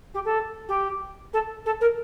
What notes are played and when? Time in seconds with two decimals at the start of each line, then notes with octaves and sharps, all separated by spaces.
0.14 G4
0.25 A4
0.68 G4
1.33 A4
1.65 A4
1.80 A#4